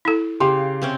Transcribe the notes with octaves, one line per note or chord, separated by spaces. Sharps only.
E4 A4
C#3 G4 F5 C6
C3 C4 C#4